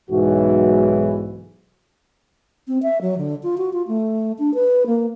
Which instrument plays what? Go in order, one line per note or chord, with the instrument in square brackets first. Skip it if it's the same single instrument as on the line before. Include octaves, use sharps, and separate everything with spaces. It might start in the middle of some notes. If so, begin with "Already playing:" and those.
[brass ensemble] B1 G#2 E3 F#4
[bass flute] C4
E5
F#3
D3
F4
F#4
F4
A3
D4
B4
A#3